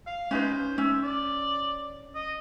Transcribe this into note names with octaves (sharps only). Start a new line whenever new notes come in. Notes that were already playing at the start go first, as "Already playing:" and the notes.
F5
C#4 D#4 B4 C5
C#4 E5
D5
D#5